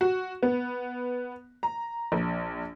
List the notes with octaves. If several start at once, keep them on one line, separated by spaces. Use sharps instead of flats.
F#4
B3
A#5
A#1